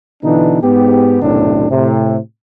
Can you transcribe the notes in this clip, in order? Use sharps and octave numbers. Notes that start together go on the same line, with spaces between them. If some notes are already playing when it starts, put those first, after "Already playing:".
B2 D3 E3 D4 D#4
G#2 B3 G4
B1 F#2 A2 C3 D#3 D4
A2 C3